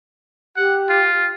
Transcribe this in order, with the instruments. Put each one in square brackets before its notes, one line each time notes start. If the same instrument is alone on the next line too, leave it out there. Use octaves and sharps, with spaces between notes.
[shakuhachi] G4 [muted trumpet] F#5
[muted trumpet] F4